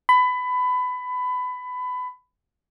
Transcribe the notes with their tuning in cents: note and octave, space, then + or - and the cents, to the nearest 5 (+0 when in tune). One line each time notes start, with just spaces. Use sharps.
B5 +20